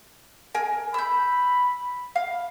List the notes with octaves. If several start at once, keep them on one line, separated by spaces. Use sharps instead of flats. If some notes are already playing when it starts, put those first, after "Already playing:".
A#4 G#5
B5 E6 G6
F5